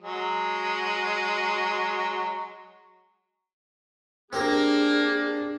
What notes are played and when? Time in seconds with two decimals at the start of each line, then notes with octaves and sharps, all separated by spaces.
0.01 F#3 G#3
4.33 A#3 C4 D4 G4 G#4 A#4